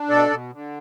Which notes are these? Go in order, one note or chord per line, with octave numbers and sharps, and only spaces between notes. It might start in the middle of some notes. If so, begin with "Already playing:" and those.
Already playing: D4
B2 A4 D5
B2
D3